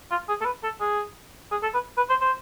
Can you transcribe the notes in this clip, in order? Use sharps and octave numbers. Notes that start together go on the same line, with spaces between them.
F4
G#4
A4
B4
A4
G#4
G#4
A4
B4
B4
C5
C5